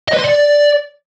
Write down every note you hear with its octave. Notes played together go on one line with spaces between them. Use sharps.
D#5
B4
C6
D5